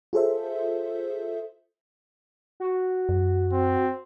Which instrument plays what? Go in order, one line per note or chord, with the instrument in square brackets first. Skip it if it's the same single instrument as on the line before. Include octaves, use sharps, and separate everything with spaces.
[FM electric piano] F4 G#4 A4 C5 E5
[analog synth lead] F#4
[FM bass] F#2
[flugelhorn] C4